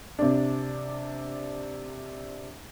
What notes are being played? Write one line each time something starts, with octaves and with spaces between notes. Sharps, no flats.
C3 D4